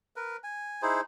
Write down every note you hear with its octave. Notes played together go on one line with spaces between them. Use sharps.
A#4 B4
G#5
D#4 E4 G#4 C5